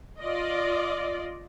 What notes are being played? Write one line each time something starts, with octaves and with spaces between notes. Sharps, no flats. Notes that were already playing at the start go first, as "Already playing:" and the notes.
F4 D5 D#5